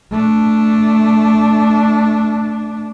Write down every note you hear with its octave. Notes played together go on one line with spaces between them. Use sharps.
A3 D4